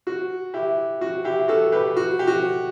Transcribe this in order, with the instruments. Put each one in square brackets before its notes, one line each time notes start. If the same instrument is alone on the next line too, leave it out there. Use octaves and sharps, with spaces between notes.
[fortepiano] F#4
E4 G4
F#4
E4 G4
F#4 A4
G4 B4
F#4
G4
F#4